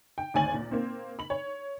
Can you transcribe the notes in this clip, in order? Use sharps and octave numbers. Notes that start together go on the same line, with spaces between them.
G5
G#1 D2 C#5 G#5 A6 F#7
A#2
A#3 C4
B5 F#7
C#5